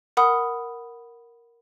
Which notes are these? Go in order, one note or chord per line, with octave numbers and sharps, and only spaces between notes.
A#4 F#5 B5 D#6